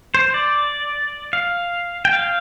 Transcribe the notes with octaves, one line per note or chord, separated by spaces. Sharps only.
C5
D5
F5
G5
F5